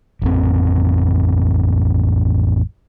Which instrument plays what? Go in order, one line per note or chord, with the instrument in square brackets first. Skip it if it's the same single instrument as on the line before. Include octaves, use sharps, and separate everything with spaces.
[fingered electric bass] A1 F2 C4